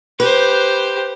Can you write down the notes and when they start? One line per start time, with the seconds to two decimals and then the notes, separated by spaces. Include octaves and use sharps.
0.20 G4 B4 C5